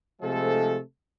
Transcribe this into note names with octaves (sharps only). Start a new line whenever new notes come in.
C3 F3 G#3 A3 A4